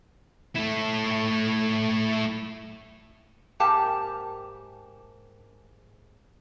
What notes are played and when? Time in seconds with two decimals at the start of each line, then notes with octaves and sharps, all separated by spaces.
0.55 A3 E4
3.60 G#2 A#3 G4 A#4 G5 A5